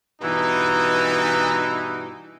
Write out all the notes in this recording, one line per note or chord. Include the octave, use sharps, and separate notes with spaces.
G2 B2 E3 D#4